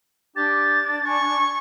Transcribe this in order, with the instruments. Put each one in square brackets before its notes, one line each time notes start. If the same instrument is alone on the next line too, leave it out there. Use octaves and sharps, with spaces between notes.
[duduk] D4 [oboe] G4 [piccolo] A6
[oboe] G#5 [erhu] C#6